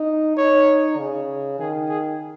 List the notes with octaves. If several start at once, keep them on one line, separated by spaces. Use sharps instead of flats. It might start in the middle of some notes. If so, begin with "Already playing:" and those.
Already playing: D#4
D#4 C#5
C#3
D#3 G#4
G#4